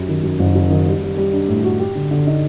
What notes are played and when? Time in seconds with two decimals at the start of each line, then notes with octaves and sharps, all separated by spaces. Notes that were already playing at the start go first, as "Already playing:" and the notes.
Already playing: F#2 G4
0.08 D#3
0.24 F#2
0.39 F#1
0.55 F#2
0.70 D#3
0.86 G3
1.02 G3
1.17 G3
1.33 D4
1.48 A2
1.64 F#4
1.79 G4
1.95 D3
2.11 D3
2.26 D#4